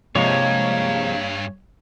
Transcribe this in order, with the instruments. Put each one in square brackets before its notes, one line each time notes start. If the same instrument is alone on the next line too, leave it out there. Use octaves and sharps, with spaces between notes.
[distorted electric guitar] G2 [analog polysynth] C3 F3 G#3 [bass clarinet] A#3 [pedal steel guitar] C#5